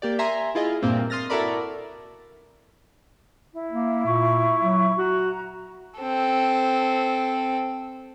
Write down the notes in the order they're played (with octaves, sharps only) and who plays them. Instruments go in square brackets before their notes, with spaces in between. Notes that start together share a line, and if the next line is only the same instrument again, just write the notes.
[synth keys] A#3 G4 D5
E5 G#5 A#5 C6
E4 F4 G#4 D#5
G2 A#2 A#3 C4
C6 D#6 F6 A6 A#6
E4 F#4 A4 A#4 D5 B5
[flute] E4
[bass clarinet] A#3
[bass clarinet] A#2 [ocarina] C#6
[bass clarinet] F#3
[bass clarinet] F#4 [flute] A#5
[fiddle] C4 A4